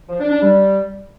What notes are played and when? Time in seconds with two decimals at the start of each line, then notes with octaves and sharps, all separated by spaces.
0.09 F3
0.20 D4
0.30 D4
0.41 G3